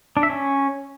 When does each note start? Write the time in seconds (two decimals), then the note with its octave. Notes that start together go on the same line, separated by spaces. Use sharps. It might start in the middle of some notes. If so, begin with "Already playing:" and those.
0.17 D4
0.23 E5
0.30 C#4